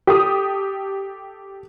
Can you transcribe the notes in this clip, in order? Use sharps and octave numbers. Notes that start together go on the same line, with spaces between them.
G4 A4 D#6